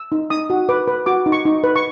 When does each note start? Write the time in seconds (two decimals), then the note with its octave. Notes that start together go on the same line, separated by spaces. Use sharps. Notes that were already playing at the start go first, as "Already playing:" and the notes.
Already playing: E6
0.12 D#4
0.30 D#4 D#6
0.50 F#4
0.69 B4 D6
0.87 B4
1.06 F#4 D6
1.26 D#4
1.32 C#6
1.45 D#4
1.64 B4
1.76 C#6